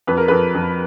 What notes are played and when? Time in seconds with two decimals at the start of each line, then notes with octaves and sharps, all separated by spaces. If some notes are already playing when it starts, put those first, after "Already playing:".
0.07 F2 B4
0.17 A#4
0.28 F2 A4 B4
0.55 F2